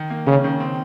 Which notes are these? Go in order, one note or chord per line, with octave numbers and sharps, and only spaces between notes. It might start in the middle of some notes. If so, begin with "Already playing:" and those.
Already playing: D#3
A#3
C#3 C#4
D#3
C4